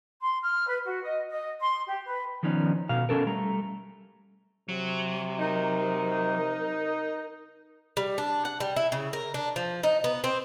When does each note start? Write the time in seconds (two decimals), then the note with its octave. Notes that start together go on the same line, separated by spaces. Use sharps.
0.22 C6
0.43 F6
0.67 B4
0.84 F#4
1.03 D#5
1.30 D#5
1.61 C6
1.87 G4
2.06 B4
2.43 D#3 F3 B3 C#4 D#4 D5
2.89 B2 F5
3.09 B2 D#3 C#4 A4 A#4
3.27 G3 A3 A#5
4.69 C3 F#3
5.40 D#4 A#4
7.97 G3
8.18 D4
8.45 F#5
8.60 G3
8.76 E4
8.92 C#3
9.13 A#4
9.34 D4
9.56 F3
9.83 D#4
10.04 B3
10.24 C4